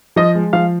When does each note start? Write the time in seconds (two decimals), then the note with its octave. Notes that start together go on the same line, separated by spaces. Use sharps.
0.16 F3 D#5
0.35 G#3
0.53 F3 F5